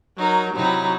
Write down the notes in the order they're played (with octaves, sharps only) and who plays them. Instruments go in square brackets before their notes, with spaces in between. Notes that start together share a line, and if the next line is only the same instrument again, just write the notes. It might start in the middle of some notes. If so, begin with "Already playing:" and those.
[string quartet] F#3 D#4 A#4
C3 F#3 D#4 E4